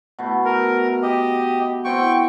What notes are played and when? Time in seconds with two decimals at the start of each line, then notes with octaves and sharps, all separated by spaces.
0.19 B2 A3
0.45 A#4
1.03 G4 D#5
1.85 B3 C4 E4 G5 C#6